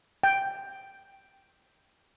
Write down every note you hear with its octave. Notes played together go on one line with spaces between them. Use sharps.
G5